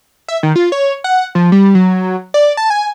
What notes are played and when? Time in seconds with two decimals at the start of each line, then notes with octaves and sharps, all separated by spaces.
0.28 E5
0.43 D#3
0.56 F4
0.72 C#5
1.04 F#5
1.35 F3
1.52 G3
1.75 F#3
2.34 D5
2.57 A5
2.70 G#5